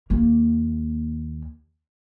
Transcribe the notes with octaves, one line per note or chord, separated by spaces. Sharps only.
D#2 A#3